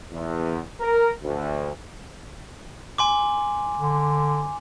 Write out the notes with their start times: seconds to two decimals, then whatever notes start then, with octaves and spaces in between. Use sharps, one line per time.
0.11 E2
0.80 A#4
1.22 D2
2.98 G#5 C6 D6
3.78 D3